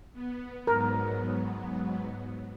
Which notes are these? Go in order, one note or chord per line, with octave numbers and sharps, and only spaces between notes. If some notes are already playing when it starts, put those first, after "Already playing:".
B3
G#2 F#3 B3 A#4